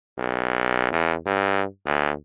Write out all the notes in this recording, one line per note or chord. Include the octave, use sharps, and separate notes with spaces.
B1
E2
G2
D2